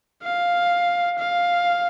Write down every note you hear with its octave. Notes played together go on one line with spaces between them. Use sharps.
F5
F5